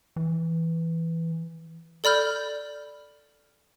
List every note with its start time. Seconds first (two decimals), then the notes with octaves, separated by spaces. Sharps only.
0.16 E3
2.04 A4 D5 B5 F6 G6